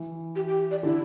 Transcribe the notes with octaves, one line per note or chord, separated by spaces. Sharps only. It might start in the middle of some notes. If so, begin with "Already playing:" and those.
Already playing: E3
G4
G4
D5
D3 E4